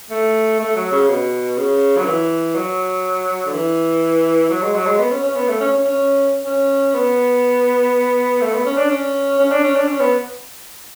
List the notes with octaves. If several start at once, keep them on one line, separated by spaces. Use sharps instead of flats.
A3
A3
F#3
C#3
B2
C#3
F#3
E3
F#3
D3
E3
F#3
G#3
F#3
G#3
B3
C#4
C#4
B3
A3
C#4
C#4
C#4
C#4
B3
A3
B3
C#4
D4
C#4
C#4
D4
C#4
D4
C#4
B3